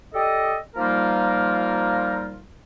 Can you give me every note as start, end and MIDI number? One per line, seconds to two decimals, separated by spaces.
0.14 0.55 67
0.14 0.55 69
0.14 0.55 74
0.14 0.55 75
0.76 2.43 53
0.76 2.43 55
0.76 2.43 58
0.76 2.43 63
0.76 2.43 65
0.76 2.43 70